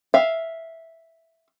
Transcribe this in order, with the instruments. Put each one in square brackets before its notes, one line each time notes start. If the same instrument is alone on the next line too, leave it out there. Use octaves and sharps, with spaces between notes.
[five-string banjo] E5 F5